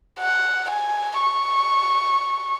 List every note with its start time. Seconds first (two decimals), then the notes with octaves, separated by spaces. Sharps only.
0.20 F#5
0.70 G#5
1.21 C#6